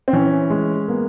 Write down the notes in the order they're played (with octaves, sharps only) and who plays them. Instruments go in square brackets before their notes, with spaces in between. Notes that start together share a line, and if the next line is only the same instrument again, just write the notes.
[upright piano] C4
[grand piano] E3 [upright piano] C#4
[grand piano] G#3
[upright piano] A#3 [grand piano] B3